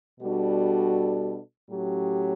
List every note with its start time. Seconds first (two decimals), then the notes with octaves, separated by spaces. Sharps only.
0.20 B2 G3 D4 F#4 A4
1.69 A2 F#3 C#4 G4